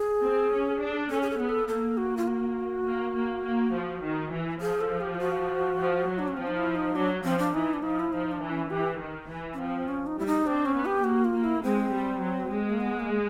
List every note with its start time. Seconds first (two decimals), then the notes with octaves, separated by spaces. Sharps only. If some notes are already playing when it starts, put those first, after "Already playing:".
Already playing: G#4
0.23 C4
0.51 C#4
0.80 D4
1.11 C#4 A4
1.22 G#4
1.30 A4
1.39 B3 G#4
1.49 A4
1.68 A#3 A4
1.97 F#4
2.17 F4
2.28 F#4
2.86 A#3
3.15 A#3
3.45 A#3
3.74 F3
4.02 D#3
4.32 E3
4.61 F3 G#4
4.81 A4
5.01 G4
5.15 F4
5.19 F#4
5.78 F3
6.08 F#3
6.19 D4
6.28 C#4
6.37 F3 C4
6.47 D#4
6.57 E4
6.75 D#4
6.95 F#3 D4
7.24 F3 C4
7.39 D4
7.54 E3 D#4
7.73 D4
7.82 F3 D#4
8.00 E4
8.12 F3 D#4
8.32 D4
8.42 E3
8.51 C#4
8.70 E3 G4
8.99 D#3
9.29 E3
9.54 C#4
9.59 F3 C4
9.88 C#4
10.07 D#4
10.18 G3 E4
10.26 D#4
10.46 C4 D4
10.65 C#4
10.76 B3
10.85 G4
11.04 A#3 F#4
11.25 F4
11.34 A#3
11.44 E4
11.63 G#3 C4
11.92 G3
12.21 F#3
12.51 G#3
12.70 A#3
12.80 B3
13.00 A#3